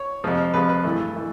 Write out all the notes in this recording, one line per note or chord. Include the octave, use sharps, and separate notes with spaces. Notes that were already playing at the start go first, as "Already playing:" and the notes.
Already playing: C#5
F2 C3 F3 G#3
F2 C3 F3 G#3 B4
B4
G2 E3 A3
E3 A3